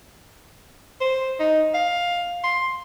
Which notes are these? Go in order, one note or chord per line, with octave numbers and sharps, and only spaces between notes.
C5
D#4
F5
C6